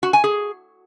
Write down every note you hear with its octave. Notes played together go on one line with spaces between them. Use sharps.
F#4
G#5
G#4